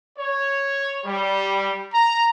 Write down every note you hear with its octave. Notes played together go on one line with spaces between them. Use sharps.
C#5
G3
A#5